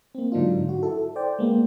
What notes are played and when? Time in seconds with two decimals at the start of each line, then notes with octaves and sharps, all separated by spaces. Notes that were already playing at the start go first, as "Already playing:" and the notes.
0.15 A#3 C4
0.32 G#2 D3 F#3 D4 D#4 F4
0.69 F#4
0.83 E4 A4
1.16 C5 D5 G5
1.39 G#3 A#3 B3